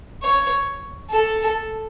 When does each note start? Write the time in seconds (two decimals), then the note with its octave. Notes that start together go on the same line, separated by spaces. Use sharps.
0.22 C#5
1.10 A4